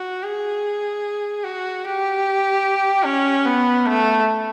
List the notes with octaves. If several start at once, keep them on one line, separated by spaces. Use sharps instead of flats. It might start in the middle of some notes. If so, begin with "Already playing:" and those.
Already playing: F#4
G#4
F#4
G4
C#4
B3
A3